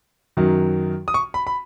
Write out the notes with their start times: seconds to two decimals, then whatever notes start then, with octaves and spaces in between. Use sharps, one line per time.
0.37 F#2 D#3 F#3
1.08 D#6
1.14 C#6
1.34 B5
1.47 B5